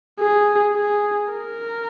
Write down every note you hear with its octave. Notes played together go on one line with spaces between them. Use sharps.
G#4
G#4
A#4